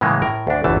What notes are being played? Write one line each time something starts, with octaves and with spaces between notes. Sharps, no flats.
A2 C#3 E3 G#3 A#3
A2 A#4
D2 D4
G1 E2 E3 A3 A5